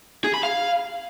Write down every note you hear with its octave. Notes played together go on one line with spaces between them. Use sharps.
G#4
B5
F5